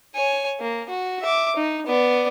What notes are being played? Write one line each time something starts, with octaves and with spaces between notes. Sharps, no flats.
C#5 G#5
A#3
F#4
E5 D6
D#4
B3 D5